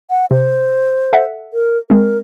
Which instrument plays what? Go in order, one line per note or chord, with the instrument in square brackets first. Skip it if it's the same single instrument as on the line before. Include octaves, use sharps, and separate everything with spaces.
[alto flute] F#5
[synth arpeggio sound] C3 [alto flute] C5
[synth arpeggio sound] A4 E5 F#5
[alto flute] A#4
[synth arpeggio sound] G#3 C4 [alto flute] A#4